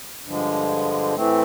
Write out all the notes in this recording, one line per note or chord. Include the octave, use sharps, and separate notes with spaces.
G2 D3 F3 G#3
A2 E3 A3 C4